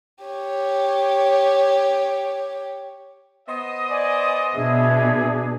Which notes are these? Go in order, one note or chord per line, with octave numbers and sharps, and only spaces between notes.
G4 C#5
B3 C5 D#5
D5 G#5
B2 D4 G#4 E5